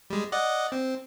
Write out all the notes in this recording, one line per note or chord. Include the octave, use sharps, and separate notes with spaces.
G3 G#3
D5 D#5 F#5
C4